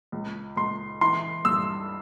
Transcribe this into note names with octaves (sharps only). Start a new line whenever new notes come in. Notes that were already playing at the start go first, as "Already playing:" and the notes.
C#2
C#2 C6
E3 C6
G2 E6